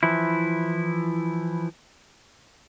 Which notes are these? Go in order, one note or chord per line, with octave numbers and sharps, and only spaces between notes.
E3 F3 E4